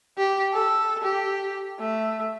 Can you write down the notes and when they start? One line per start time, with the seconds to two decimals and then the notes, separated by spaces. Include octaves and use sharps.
0.18 G4
0.53 A4
1.04 G4
1.80 A3